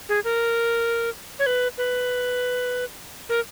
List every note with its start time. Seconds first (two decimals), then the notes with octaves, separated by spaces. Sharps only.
0.09 G#4
0.24 A#4
1.39 C#5
1.46 B4
1.78 B4
3.29 A#4